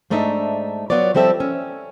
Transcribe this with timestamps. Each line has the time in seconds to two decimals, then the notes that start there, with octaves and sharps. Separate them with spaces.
0.10 G#2 A3 D4 D#4 E5
0.90 F#3 B3 F4 C#5 D5
1.15 F3 G3 C4 A4 E5
1.40 C#4